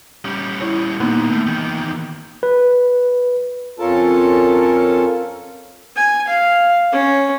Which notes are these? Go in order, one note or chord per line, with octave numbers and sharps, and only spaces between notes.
G3 C#4
E4 C#5
A#2 D#3 A#3 B3 D#4
A2
E2 D#3
B4
F2 C#4 F4 A4 A#4 A5
G#5
F5
C#4